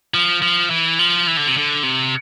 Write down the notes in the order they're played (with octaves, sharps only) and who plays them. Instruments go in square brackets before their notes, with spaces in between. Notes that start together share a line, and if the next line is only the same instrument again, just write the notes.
[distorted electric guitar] F3
F3
E3
F3
E3
D3
C3
D3
C3